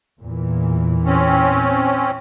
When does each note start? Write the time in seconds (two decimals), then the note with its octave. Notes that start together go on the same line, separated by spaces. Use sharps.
0.21 E2 A#2 E3
1.05 C4 C#4